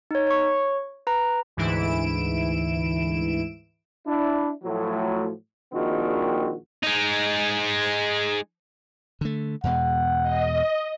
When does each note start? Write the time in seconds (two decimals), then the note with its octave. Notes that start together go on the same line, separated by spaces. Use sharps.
0.11 D#4 C#5
0.27 C#5 C#6
1.07 B4 A#5
1.57 D2 G#2 E3 E4 D7 E7
4.07 D4 E4
4.63 A2 F3 F#3
5.73 A#1 A#2 D#3 G#3 C4 F#4
6.83 G#3 D#4
9.21 D3 A3
9.64 E2 B2 G#3 F#5
10.22 D#5